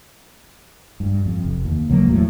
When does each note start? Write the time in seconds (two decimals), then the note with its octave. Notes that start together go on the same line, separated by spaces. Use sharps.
1.00 G2
1.26 F2
1.44 F1
1.65 D#2
1.89 C#2 F3 F#3 A#3
2.08 E2 A2 F#3